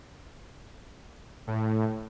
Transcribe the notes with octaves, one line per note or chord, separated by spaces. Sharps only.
A2